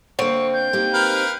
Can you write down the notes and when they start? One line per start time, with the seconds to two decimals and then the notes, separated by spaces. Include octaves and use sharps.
0.19 D3 A#3 C4 C#6
0.53 G6
0.73 A#3 D#4 G4
0.93 A#4 B4 F5